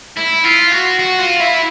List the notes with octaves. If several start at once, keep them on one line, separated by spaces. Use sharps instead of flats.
E4
F4
F#4
F#4
F4
E4